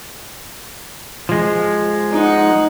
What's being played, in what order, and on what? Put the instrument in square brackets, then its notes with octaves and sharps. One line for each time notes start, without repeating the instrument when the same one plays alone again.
[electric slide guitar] F3 G#3
[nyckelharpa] D#4 F#5